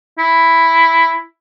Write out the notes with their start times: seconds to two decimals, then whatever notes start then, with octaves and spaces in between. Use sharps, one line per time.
0.19 E4